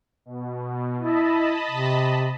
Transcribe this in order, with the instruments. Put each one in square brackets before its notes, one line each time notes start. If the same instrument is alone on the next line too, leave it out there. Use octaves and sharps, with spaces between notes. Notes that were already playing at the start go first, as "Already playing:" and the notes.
[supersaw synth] B2
[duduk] E4 [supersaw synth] D#5 A5 B5
[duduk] C3